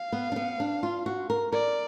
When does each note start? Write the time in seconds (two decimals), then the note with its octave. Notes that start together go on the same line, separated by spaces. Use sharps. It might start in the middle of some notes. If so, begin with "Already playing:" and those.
Already playing: F5
0.12 B3
0.32 D4
0.36 B3
0.60 D4
0.83 F4
1.06 F#4
1.30 A#4
1.52 A#4 D5